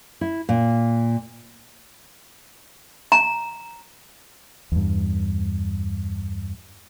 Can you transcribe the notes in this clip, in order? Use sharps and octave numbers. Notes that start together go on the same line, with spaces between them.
E4
A#2
A#5
E2 G2